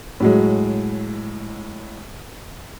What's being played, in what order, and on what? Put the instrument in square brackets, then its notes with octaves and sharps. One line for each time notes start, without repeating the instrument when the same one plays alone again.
[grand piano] A2 F#3 G#3